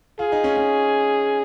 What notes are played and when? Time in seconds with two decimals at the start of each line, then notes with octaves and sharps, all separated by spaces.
0.19 F4 G#4
0.32 D#4
0.44 C#4
0.57 C#4